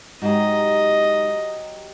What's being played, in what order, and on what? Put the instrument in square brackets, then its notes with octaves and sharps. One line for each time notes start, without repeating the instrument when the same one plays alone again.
[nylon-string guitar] G#2 [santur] F#3 G4 A#5 [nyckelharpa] D#5